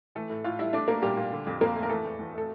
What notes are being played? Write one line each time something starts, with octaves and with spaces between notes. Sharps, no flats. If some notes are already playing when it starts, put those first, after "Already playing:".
E3 A3 A4
A2
A2 F4 F5
G3 E4 E5
A3 D4 D5
A3 A#3 A#4
A#2 G3 G4
A#2
D3
F2
F2 A#3 A#4
A3
A#4
E3 A3 A4
E2
E2
A3 A4